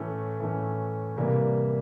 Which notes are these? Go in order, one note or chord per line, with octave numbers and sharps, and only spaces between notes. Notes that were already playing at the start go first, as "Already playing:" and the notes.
Already playing: A2 E3 A3 C#4
A2 E3 A3 C#4
C2 C3 E3 G3 A#3